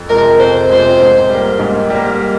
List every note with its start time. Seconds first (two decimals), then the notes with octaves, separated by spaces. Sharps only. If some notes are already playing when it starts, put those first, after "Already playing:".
Already playing: F2
0.09 C3 F3 G#3 A#4
0.39 F2 C5
0.70 C3 F3 G#3 C5
1.00 G#2
1.30 G3 A#3
1.59 G#2
1.90 G3 A#3